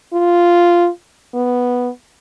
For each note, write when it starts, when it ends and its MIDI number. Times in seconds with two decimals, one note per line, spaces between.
0.13 0.89 65
1.34 1.89 59